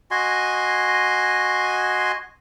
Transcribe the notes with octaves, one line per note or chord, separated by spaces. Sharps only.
F#4 D#5 G#5 C6